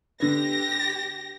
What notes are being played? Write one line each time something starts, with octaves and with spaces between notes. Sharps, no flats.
D3 B3 G4 A#6